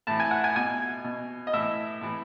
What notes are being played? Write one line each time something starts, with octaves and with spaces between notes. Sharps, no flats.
A2 E3 A5
G#5
F#5
G#5
B2 G#5
B2
D#5
A2 E3 E5
A2 E3